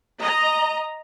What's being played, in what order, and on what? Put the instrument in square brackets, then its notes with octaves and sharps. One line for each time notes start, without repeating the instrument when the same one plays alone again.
[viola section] D#5 A#5